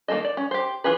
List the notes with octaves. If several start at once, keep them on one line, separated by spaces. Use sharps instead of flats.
D#3 A#3 C4 A4 D#5
D5
C#4
G4 C5
E3 F4 G#4 B4